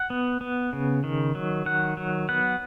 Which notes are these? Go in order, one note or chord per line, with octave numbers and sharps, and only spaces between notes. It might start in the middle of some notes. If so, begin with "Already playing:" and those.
Already playing: F#5
B3
B3
C#3
D#3
F#3
D#3 F#5
F#3
B3 F#5